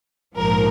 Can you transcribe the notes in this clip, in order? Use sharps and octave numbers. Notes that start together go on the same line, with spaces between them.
A#1 G#2 F3 A#4